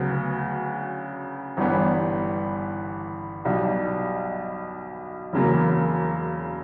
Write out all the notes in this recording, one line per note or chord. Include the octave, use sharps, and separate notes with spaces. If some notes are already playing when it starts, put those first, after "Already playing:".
Already playing: D2 C#3 F#3 B3
G1 G2 E3 G3 B3
B1 B2 G3
E1 E2 C#3 F#3 A#3